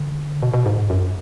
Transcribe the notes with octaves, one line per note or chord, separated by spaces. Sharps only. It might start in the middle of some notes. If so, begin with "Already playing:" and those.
Already playing: D3
B2
B2
G#2
F#2